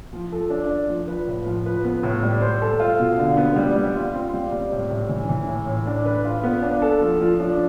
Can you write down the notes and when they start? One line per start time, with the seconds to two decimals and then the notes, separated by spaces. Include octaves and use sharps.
0.13 F3
0.32 A4
0.50 D4
0.69 D5
0.88 F3
1.08 B4
1.27 A2
1.46 F3
1.66 B4
1.84 B3
2.03 A2
2.23 G3
2.42 C5
2.62 A4
2.80 F4
2.99 B2
3.19 D3
3.37 B3
3.56 G3
3.76 G3
3.95 F4
4.15 C4
4.34 G3
4.52 G3
4.72 A2
4.90 A2
5.09 E3
5.29 E3
5.47 A2
5.67 A2
5.87 D4
6.05 B4
6.25 F4
6.44 B3
6.63 D4
6.82 A4
7.01 F3
7.21 F3
7.40 D4